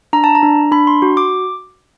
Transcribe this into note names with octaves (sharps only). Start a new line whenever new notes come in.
D4 A#5
A5
A#5
D4
D4 B5
C6
F#4
D6